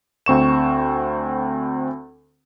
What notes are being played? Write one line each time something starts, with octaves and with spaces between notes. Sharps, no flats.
D2 C4 C#6 E7